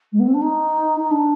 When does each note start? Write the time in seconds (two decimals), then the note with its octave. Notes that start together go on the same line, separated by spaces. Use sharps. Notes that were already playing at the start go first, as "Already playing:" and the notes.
0.12 G#3
0.19 B3
0.27 C4
0.34 D4
0.41 D#4
1.00 D#4
1.10 D4